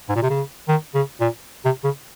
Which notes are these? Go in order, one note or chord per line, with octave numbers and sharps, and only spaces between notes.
G#2
A#2
C3
C#3
D#3
C#3
A#2
C3
C#3